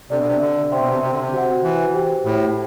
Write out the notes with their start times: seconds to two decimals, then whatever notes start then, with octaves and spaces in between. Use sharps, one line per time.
0.10 C3 D4 A4 D5
0.18 B2
0.26 C3
0.41 D3
0.71 C3 C5 E5 G5 C6
0.80 B2
0.88 C3
1.02 C3
1.11 D3
1.20 C3
1.33 F#4 C5 F#5
1.64 E3
1.94 G4 C5 G5
2.24 A2